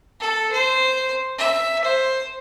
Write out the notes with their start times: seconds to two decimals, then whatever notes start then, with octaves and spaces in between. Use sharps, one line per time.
0.20 A4
0.52 C5
1.38 E5
1.84 C5